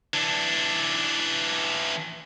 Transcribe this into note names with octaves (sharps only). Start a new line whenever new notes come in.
E3 D4